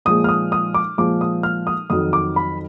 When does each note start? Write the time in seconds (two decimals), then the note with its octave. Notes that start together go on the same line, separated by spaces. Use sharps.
0.05 A#2 F3 G#3 D#6
0.24 F6
0.29 D#6
0.52 D#6
0.74 D6
0.98 A#2 F3 G#3 D6
1.21 D#6
1.43 F6
1.67 D#6
1.90 F2 D#3 F#3 D#6
2.13 D6
2.36 B5